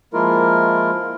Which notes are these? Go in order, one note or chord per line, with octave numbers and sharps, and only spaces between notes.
F3 G#3 A#3 E4 F4 A#4